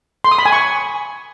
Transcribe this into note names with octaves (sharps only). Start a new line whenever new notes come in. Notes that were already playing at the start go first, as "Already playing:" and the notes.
C6
D#6
B5
G#5
C#6